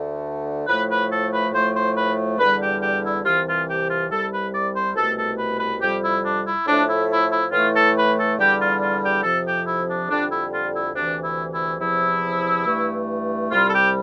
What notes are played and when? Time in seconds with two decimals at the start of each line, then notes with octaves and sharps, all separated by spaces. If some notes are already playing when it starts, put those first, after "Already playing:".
Already playing: D2 D3 A3
0.67 A2 F3 A3 B4
0.89 B4
1.10 A4
1.31 B4
1.52 A2 F3 A3 C5
1.74 C5
1.95 B4
2.39 E2 D3 G3 B4
2.60 G4
2.81 G4
3.03 E4
3.24 C2 C3 E3 F4
3.46 F4
3.67 G4
3.88 F4
4.09 C2 C3 G3 A4
4.31 B4
4.52 D5
4.73 C5
4.95 C2 B2 A3 A4
5.16 A4
5.38 B4
5.59 B4
5.81 F2 C3 G3 G4
6.02 E4
6.24 D4
6.45 E4
6.66 A2 F3 A3 D4
6.87 E4
7.10 E4
7.30 E4
7.51 A2 E3 A3 F4
7.74 A4
7.95 B4
8.17 A4
8.37 E2 D3 G3 G4
8.59 F4
8.81 F4
9.02 G4
9.23 F2 C3 F3 A4
9.45 G4
9.66 E4
9.88 D4
10.09 F2 D3 G3 D4
10.30 E4
10.52 F4
10.73 E4
10.95 D2 C3 E3 D4
11.22 E4
11.52 E4
11.80 E2 C3 F3 E4
12.65 G2 E3 A3
13.51 C2 C3 G3 F4
13.67 A4
13.72 G4